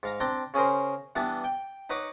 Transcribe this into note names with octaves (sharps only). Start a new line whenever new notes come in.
G#2 F5 A#5
C4 D4 G5 A#5
C#3 C#4 G#4 A#4 C5
E3 G3 B3 D4
G5
D#4 B4 C#5 F#5 D6